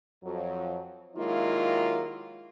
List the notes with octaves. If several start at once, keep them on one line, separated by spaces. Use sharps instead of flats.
F2 F#3
D#3 F#3 G#3 A#3 E4 F4